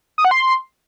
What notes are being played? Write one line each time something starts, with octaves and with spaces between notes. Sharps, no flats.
D#6
F#5
C6